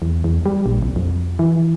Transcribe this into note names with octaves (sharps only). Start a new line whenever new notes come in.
E2
E2
G3
A#1
C2
F2
E3